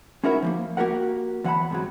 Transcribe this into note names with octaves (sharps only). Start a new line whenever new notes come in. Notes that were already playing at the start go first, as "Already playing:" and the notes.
C#4 D#4 E4 F#4 A#4 C#5
F3 A3 A#3
A#3 F#4 G4 A#4 F#5
E2 F#3 F#5 G#5 A5 B5
G#2 C3 F#3